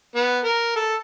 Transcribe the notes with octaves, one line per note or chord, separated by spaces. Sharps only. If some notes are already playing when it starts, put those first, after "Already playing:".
B3
A#4
A4